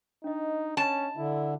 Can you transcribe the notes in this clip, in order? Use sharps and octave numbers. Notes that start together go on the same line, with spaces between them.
D4 D#4 D#5
C#4 A5
D3 E4